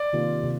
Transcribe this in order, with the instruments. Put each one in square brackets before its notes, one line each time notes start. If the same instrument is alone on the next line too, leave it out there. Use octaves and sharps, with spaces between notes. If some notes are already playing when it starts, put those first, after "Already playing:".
Already playing: [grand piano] D5
[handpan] C3 D#3 A#3 F4
C3